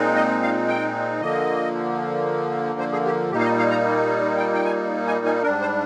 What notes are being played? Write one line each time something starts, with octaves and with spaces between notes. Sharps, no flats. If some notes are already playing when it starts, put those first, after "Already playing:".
Already playing: A#2 G#3 C4 D#4
D#5
F5
G5
D3 F3 A#3 D#5
C5
G#4
G4
A#2 G3 A#3 D#4 G4
F5
D#5
F5
A#5
G5
G5
G#5
G#5
G#5
G#2 G3 D4 A#4
C5